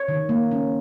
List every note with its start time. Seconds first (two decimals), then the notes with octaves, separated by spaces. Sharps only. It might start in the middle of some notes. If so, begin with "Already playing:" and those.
Already playing: C#5
0.08 D#3
0.29 A#3
0.51 C#4